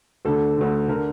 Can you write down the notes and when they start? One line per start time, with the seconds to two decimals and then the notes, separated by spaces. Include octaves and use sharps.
0.25 D2 D3 A4
0.57 D2 D3
0.88 D3 A#4